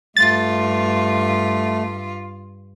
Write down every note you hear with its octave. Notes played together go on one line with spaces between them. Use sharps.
G2 A3 F4 A6